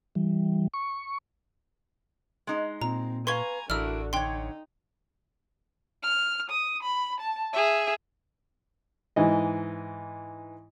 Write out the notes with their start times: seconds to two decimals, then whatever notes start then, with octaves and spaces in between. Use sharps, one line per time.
0.15 E3 G3
0.74 C#6
2.47 G#3 D#4
2.81 A#2 C4 A#5
3.27 B4 F5 G#5 A#5 C6 C#6 G#6
3.70 A1 D3 D4 E4 F#4 A#4 E6 F6
4.13 D3 D#4 C#5 G5 C6
6.03 F6
6.50 D#6
6.83 B5
7.20 A5
7.53 G#4 E5
9.16 G#2 E3 D#5